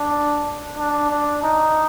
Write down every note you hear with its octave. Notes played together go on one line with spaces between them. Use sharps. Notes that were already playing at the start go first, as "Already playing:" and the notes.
Already playing: D4
D4
D4
D#4